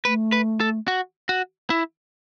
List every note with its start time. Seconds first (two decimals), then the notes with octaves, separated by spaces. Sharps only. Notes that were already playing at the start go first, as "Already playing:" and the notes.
0.05 A3 B4
0.32 B4
0.60 A4
0.88 F#4
1.29 F#4
1.70 E4